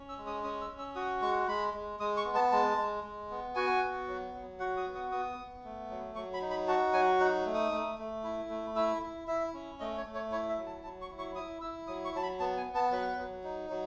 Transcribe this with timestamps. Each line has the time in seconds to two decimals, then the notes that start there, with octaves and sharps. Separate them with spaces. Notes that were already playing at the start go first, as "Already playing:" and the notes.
Already playing: C#4
0.09 E6
0.18 G#3
0.27 D#6
0.44 C#4 D#6
0.61 E6
0.70 C#4
0.78 E6
0.95 F#4 D#6
1.22 G#3 C#6
1.48 G#3 B5
1.74 G#3
2.00 G#3 D#6
2.17 C#6
2.26 B3
2.35 A5
2.52 G#3 A5
2.77 G#3
3.04 G#3
3.30 B3
3.55 F#4 G#5
3.81 B3
4.08 F#3
4.34 F#3
4.59 F#4 F#5
4.77 D#6
4.86 B3
4.95 D#6
5.12 B3 D#6
5.38 B3
5.64 A3
5.90 F#3
6.15 F#3 C#6
6.33 B5
6.42 D#4
6.50 B5
6.68 F#4 A5
6.93 F#3 G#5
7.20 D#4 F#5
7.46 A3
7.54 D#6
7.72 A3
7.98 A3
8.24 E4
8.50 A3
8.76 E4 E6
9.02 E4
9.27 E4 E5
9.54 C#4
9.80 A3 D#5
9.97 C#5
10.06 A3
10.14 C#5
10.31 E4 C#5
10.49 E5
10.58 F#3
10.66 A5
10.84 F#3 A5
11.01 C#6
11.10 E4
11.19 C#6
11.35 E4 D#6
11.61 E4 E6
11.87 F#3 D#6
12.05 C#6
12.14 F#3 A5
12.23 B5
12.40 B3 A5
12.57 G#5
12.66 B3
12.75 A5
12.91 F#3 B4
13.18 F#3
13.44 D#4
13.70 F#3